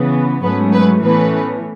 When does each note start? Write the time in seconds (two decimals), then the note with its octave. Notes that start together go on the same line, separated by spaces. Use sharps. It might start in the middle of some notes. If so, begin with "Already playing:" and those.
Already playing: C#3 E3 B3
0.42 G#2 F#3 A3 B3 C#4 B4
0.72 B3 B4
1.02 A2 E3 A3 B3 C#4 B4